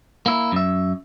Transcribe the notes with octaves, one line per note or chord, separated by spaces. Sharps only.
A#3 E4
F#2 E5